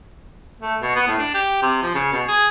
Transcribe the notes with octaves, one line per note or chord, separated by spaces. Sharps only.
A3
B2
B3
A2
D4
G4
C3
F3
C#3
B2
G#4